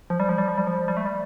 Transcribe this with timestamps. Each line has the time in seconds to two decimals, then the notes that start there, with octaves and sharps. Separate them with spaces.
0.10 F3
0.20 G3
0.29 F3
0.38 G3
0.48 F3
0.58 G3
0.67 F3
0.88 G3
0.97 A3
1.06 G3